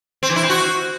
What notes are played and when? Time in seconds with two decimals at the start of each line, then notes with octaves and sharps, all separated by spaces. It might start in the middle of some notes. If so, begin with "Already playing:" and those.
0.23 C4
0.29 E3
0.36 E4
0.43 C4
0.50 F#4